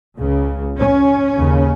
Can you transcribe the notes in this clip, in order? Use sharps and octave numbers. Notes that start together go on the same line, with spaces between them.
C#2 C#3
C#4
D#2 C#3